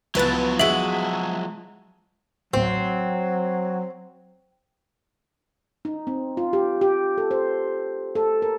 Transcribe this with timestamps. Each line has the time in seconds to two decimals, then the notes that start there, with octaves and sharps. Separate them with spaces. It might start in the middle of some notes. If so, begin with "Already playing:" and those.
0.15 C#2 F3 F#3 B3 E4 B4 A6
0.59 G#3 F#4 E5 F#7
2.53 A1 D2 A2 F#3 C4
5.85 D#4
6.07 C4
6.37 F4
6.53 G4
6.81 G4
7.18 A4
7.31 C5
8.15 A4
8.42 A#4